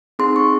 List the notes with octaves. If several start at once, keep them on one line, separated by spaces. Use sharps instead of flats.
C4 D#4 G#4 C6
C#6